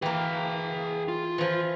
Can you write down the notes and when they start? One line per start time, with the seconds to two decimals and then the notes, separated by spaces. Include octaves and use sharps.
0.02 E3 A#3 G#4 G5
1.08 F4
1.38 E3 F3